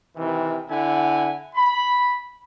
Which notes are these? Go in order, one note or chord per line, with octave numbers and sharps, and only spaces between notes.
C3 D#3 E3
D3 E4 F#5 G#5
B5